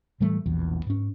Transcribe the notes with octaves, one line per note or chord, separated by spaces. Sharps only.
A2 E3 G3 A3
E1 A#1 E2
G#2 C#4